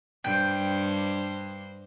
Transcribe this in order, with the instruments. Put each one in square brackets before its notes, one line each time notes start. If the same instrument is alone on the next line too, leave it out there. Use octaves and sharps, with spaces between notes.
[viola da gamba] G2 C5 [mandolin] G5